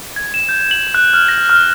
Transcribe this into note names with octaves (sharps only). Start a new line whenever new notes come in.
G#6
E7
G6
F#7
F#6
F6
A#6
F6